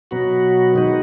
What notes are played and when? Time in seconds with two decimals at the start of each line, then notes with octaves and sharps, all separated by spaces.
0.11 B2 F#3 B3 F#4
0.74 D#3 G#3 B3 D#4 F#4